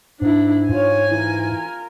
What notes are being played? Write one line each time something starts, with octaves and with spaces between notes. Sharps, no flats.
G#2 D4 E4
G#2 F4 C#5 G#5
E3 F4 A#4